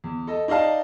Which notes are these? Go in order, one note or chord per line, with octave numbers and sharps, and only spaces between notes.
E2
A4 D#5
D#4 D5 D#5 F5 A5